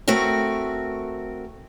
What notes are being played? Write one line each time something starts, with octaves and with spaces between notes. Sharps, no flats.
A3 C4 F#4 A#4